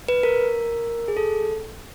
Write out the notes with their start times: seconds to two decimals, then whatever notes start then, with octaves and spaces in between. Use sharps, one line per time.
0.08 B4
0.23 A#4
1.08 G#4
1.17 A4